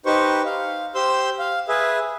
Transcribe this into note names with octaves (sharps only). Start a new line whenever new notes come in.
D#4 G4 B4 C5 C#6
F5
G4 C5 C6 E6 G6
F5
G#4 B4 E5